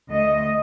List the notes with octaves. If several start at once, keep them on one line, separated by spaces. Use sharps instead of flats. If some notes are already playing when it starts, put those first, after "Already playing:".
D2 D3 A3 D#5